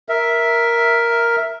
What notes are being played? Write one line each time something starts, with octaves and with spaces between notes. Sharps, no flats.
A#4 E5